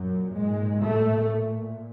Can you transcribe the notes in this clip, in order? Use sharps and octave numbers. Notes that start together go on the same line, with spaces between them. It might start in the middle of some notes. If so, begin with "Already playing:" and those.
Already playing: F#2 A#2 F#3
G#2 G#3
A2 A3